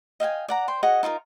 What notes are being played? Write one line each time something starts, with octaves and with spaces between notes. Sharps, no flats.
D#5 F5 G5 G#5
D5 F#5 A#5
C5 G5 C6
F#4 G#4 D#5 F#5
D#4 F4 A4 A#4